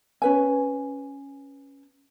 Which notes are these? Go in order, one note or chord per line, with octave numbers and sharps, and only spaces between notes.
C#4 B4 G#5